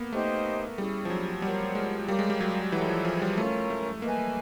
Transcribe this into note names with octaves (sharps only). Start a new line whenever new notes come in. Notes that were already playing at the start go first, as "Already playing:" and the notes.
Already playing: A#3 B3
A3 D#4 G4 C5 D#5
G3 C#4 E4 G#4
F3
F#3
G3 F4 A#4 C#5 F#5
G#3
G3 G4 A#4 C#5 F5
G#3
G3
F#3
E3 E4 A4 C#5 F#5
F3
F3
G3
A3 C#4 F4 A#4 C#5
A3
A#3 B4 D#5 G#5